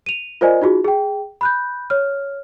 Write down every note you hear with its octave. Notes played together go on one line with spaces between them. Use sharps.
D#7 F7
F4 A#4 C5 D5 D#5 G#5
D#4 F4 F#4 G#4
G#4 G5
B5 F#6 G6
C#5 F6